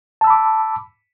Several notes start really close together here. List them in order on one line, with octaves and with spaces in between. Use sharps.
A5 E6 B5 D6